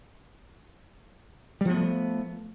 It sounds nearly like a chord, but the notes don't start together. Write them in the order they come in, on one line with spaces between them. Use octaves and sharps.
G3 F3 B3 A3